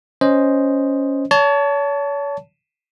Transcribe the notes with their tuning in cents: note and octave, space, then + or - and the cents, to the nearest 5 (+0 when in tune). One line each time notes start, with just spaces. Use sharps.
C#4 +0 C5 +0 D#5 +0
C#5 +35 A5 +0